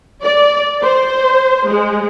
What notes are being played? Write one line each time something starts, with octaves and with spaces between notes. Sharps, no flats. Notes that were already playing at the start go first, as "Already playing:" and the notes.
D5
C5
G#3